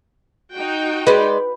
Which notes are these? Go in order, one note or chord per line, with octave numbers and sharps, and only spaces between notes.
D#4 F#4 G5
G#3 B4 D5